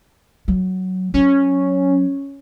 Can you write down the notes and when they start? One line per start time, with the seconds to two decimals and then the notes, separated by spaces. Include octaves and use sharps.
0.48 F#3
1.14 F#3 C#4